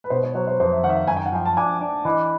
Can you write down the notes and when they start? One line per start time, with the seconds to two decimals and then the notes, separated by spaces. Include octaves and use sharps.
0.04 B4
0.10 B2 C5
0.23 C#5
0.35 F#3 C5
0.47 C5
0.60 F2 C5
0.72 E5
0.84 D#3 F#5
0.90 E5
0.95 F5
1.07 F#2 G#5
1.17 G5
1.26 F#5
1.32 F3 G5
1.45 A5
1.57 D4 G#5
1.81 D4
2.05 E3 D#5